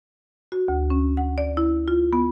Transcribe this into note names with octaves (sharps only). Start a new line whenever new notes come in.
F#4
D2
C#4
F#5
D5
E4
F4
B3